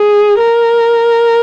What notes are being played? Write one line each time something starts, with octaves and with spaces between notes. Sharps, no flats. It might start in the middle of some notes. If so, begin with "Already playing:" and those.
Already playing: G#4
A#4